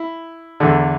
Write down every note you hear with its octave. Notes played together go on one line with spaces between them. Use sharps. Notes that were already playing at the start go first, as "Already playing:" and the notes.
Already playing: E4
E2 D3